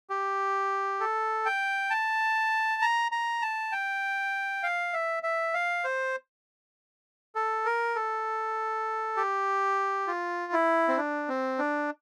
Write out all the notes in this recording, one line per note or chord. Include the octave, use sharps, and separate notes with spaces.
G4
A4
G5
A5
A#5
A#5
A5
G5
F5
E5
E5
F5
C5
A4
A#4
A4
G4
F4
E4
C4
D4
C4
D4